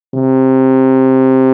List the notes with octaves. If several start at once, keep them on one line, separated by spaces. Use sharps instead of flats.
C3